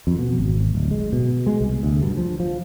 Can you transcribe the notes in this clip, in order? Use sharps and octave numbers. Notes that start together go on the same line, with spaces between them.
F2
B2
G#1
D1
G#3
B2
G#3
C2
D2
G2
F3
F3